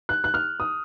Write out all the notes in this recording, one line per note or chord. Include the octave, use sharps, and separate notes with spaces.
F#6
F#6
F6
D#6